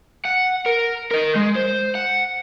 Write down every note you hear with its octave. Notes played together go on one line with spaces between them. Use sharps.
F#5
A#4
A#4 D#5
G#3
C5
F#5